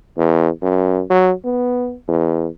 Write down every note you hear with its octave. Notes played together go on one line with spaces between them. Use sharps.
E2
F#2
F#3
B3
E2